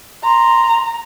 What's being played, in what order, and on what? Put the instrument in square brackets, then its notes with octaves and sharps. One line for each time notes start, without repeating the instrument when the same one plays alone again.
[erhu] A#5 [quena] C6